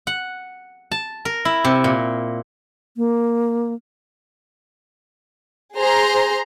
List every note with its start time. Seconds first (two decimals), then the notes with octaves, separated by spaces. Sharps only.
0.07 F#5
0.92 A5
1.25 A#4
1.45 E4
1.64 C3
1.84 A#2
2.95 A#3
5.76 G#4 C5 A#5 C6